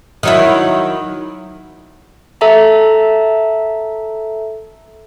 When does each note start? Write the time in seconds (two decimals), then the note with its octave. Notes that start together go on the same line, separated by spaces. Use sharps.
0.23 D#3 F#3 E4
2.41 A4 E5 A5 A#5